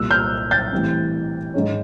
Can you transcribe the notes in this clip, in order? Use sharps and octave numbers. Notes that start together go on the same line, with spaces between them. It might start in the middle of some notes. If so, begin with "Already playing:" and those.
Already playing: C2 A#2 G3 E6 F#6
F6 G6
G6 A6
A2 E3 G3 C4
G#2 D#3 G#3 C#4